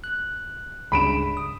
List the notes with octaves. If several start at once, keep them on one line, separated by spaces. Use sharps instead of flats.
F#6
C#2 G2 C#3 B5 D7 E7
D#6